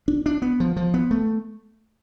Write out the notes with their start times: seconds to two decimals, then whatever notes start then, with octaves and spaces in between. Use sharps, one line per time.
0.08 D4
0.26 D4
0.42 B3
0.60 F3
0.77 F3
0.94 B3
1.11 A3